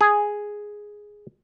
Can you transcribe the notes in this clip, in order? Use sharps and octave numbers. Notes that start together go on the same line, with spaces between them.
G#4